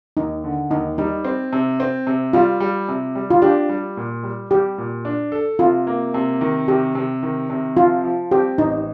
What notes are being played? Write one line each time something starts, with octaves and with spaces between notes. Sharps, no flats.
D#2 D#4
D3
D#2 D#4
G3 D#4
C4
C3
C4
C3
G3 F4
G3
C3
G3
F4
D4 G4
G3
A#2
G3
G3 G4
A#2
D4
A4
C3 F4
A#3
C3
D#3
C3 G4
C3
D#3
C3
F3 F4
F3
C4 G4
A1 D#4